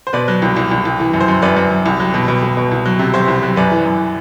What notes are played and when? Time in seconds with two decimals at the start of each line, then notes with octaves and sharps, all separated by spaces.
0.07 C5
0.13 B2 B4 D5
0.28 F#3
0.42 C2
0.57 C2
0.71 C2
0.85 C2
1.00 E3
1.14 F#2
1.21 C5
1.28 F#2
1.42 F#2 B4 D5
1.56 F#2
1.71 F#2
1.86 C2
2.00 F#3
2.14 B2
2.28 B2
2.42 B2
2.57 B2
2.71 C2
2.86 F#3
2.99 C3
3.14 F#3 C5 E5
3.28 C2
3.43 F#3
3.56 F#2 B4 D5
3.72 E3
3.86 F#2